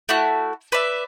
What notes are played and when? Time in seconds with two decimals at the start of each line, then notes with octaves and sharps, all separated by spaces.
0.09 A3 E4 F#4 F#6
0.72 B4 D5 E5